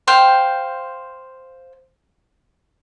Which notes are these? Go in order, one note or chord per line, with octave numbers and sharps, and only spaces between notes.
C5 F5 G5